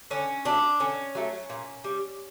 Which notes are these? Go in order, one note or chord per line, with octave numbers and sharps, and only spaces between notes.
D3 C#4
F#3 A3 D4
D3 C#4
F#3 A3
A#2
G3